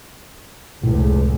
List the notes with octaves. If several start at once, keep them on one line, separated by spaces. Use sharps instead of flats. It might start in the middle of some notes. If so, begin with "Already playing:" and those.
F1 C#2 A2